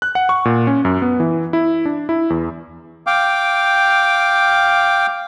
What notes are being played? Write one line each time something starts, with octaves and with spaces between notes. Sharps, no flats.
F#6
F#5
C#6
A#2
C#4
F#2
B3
E3
E4
D4
E4
E2
F5 G5 D6